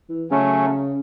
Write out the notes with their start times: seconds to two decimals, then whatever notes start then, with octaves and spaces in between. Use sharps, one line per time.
0.09 E3
0.31 C#3 F#3 A3 C#4